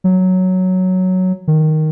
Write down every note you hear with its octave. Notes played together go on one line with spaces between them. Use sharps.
F#3
D#3